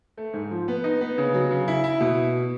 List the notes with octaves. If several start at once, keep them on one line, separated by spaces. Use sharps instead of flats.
A3
G#2
F3
B3
D#4
B3
C#3
F#3
C#3
E4
E4
B2